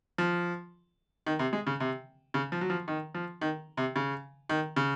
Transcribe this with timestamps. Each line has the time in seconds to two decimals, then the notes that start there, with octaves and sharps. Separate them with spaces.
0.18 F3
1.27 D#3
1.39 C3
1.53 G#3
1.67 C#3
1.80 C3
2.34 C#3
2.52 F3
2.61 F#3
2.70 F3
2.88 D#3
3.15 F3
3.41 D#3
3.77 C3
3.96 C#3
4.49 D#3
4.76 C#3